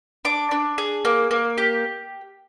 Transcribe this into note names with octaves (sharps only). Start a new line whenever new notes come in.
D4 D6
D4
G#4
A#3
A#3
G4